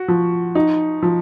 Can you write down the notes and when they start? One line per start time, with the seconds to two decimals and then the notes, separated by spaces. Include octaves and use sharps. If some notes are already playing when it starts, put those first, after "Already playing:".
Already playing: F#4
0.08 F3
0.55 D#4
1.03 F3